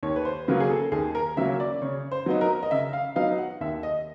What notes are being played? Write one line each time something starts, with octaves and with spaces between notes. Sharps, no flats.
D#2 C#5
B4
C5
C#3 F#3 A#3 C#4 B4
G#4
A4
D#2 G#4
A#4
C#3 F#3 A#3 C#4 E5
D5
C#3 C#5
C5
F#3 B3 D#4
A#4
D#5
C#3 E5
F5
F#3 B3 D#4 F5
F#5
D#2 E5
D#5